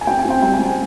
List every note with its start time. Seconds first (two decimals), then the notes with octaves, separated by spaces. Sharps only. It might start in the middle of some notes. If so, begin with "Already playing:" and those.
0.01 G#5
0.07 C4 G5
0.19 G#5
0.25 C4
0.30 G5
0.42 G3 G5
0.53 G#5
0.59 C4
0.66 G#5